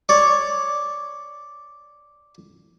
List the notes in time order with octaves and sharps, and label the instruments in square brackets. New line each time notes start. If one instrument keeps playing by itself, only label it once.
[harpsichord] C#5 D5